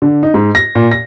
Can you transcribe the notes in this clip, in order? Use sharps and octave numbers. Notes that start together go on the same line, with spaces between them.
D3
D#4
G#2
A#6
A#2
A#6